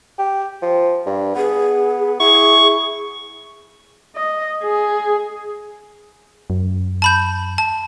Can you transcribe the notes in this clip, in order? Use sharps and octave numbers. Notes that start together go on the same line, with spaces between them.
G4
F3
G2
B3 G#4
E4 G#4 C#6
D#5
G#4
F#2
A5 B5 G6
A5